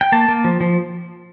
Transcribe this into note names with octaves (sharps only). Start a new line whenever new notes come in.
G5
A#3 A5
A#3
F3
F3